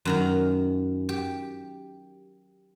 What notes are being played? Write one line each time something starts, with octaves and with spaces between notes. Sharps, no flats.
F#2 D#3 A#5
G4